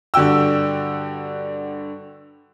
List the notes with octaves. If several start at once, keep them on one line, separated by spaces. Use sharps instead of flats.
G2 D3 F#4 G5 E6